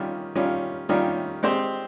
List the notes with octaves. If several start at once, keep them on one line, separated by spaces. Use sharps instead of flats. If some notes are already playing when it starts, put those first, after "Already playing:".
Already playing: D#3 G3 C#4 F4
D#3 G3 C#4 F4
D#3 G3 C#4 F4
G#3 C4 G4 C5